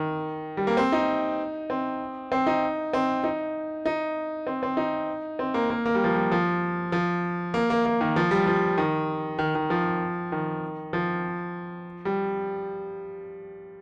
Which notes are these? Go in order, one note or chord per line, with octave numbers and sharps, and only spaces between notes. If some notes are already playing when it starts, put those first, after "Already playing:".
Already playing: D#3
G3
A#3
C4
D#4
C4
C4
D#4
C4
D#4
D#4
C4
C4
D#4
C4
A#3
A#3
A#3
G3
F3
G3
F3
F3
A#3
A#3
A#3
D#3
F3
G3
F3
D#3
D#3
D#3
F3
D#3
F3
G3